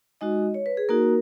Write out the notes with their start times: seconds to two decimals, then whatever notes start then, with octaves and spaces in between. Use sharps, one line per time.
0.21 G#3 D#4 F#4 D#5
0.54 C#5
0.66 B4
0.77 G#4
0.89 A#3 D#4 F#4 A#4